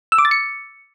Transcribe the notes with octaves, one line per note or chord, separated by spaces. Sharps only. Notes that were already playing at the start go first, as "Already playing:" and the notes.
E6
D6
A6
C#7